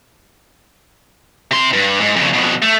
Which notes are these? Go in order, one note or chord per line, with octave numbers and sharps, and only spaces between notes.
C3 C6
G2
G#2
F2 C#3
F2 B2
A3